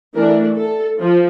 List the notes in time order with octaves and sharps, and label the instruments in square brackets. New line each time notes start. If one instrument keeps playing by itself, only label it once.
[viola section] E3 A3 D4 A#4
A4
F3